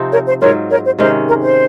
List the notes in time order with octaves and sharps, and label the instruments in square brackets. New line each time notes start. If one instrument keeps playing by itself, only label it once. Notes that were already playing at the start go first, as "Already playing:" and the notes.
Already playing: [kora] C3 F3 C4 D#4
[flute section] A#4 C#5
C5
[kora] G#2 F#3 C4 F4 [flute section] A#4 C#5
[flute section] A#4 C#5
C5
[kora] C3 D#3 G#3 C#4 [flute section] C5
[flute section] A#4
C5